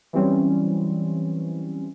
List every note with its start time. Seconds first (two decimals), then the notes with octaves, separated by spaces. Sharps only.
0.13 E3 F#3 G3 C4 C#4